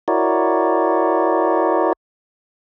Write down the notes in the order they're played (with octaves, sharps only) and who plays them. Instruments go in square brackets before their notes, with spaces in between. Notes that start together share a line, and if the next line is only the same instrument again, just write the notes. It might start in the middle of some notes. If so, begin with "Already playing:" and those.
[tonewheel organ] E4 F#4 A#4 C#5 D5